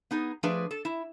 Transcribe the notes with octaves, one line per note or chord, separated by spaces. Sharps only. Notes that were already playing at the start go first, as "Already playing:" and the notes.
B3 D#4 G#4
F3 A3 D4 G#4 B4
A4
E4